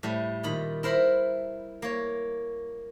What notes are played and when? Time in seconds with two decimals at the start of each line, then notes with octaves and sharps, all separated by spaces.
0.03 A2 G3 A3
0.43 A#2 D#3 B5
0.83 E4 A#4 C5 B5
1.82 A#3 C#5